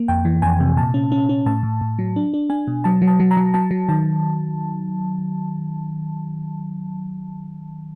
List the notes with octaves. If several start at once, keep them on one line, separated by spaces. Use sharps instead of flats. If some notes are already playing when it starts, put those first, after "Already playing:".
Already playing: A#3
F2 G5
E3
F2 G#5
C3
A#2 A5
C#4
C#4
C#4
A2 A5
A2
A2
F#3
D4
D4
D4 G#5
B2
F#3 A5
F#3
A5
F#3
A#5
F#3
F#3 A5
F#3
D#3 A5